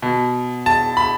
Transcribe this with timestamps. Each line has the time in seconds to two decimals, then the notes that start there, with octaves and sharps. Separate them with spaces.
0.02 B2
0.66 A5
0.97 B5